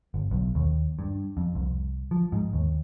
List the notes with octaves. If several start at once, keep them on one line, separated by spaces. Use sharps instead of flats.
G1
B1
D#2
G2
F2
C2
F3
G#2
D#2